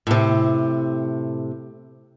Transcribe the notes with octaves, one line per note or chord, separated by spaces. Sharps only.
A2 C3